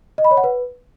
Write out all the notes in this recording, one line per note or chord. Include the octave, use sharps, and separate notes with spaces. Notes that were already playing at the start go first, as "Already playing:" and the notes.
D#5
B5
C#5
F#5
B4